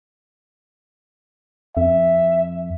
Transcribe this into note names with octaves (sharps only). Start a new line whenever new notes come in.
F2 E5